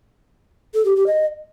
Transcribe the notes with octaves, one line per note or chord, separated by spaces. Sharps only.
A4
G4
G4
D#5